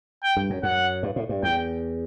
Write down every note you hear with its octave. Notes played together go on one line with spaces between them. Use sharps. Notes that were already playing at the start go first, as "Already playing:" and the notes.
G5
G2
F#2
F#2 F#5
G2
A2
G2
E2 G5